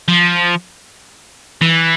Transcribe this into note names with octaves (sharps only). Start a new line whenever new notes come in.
F3
E3